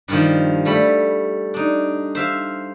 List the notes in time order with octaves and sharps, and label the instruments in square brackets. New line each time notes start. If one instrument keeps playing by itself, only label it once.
[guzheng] G2 D#3 F3
G3 A3 B5
D4 D#4
C5 E5 F5